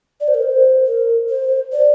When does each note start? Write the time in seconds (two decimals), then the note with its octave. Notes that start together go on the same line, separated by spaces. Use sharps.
0.21 D5
0.28 C5
0.34 A#4
0.42 C5
0.86 A#4
1.29 C5
1.73 D5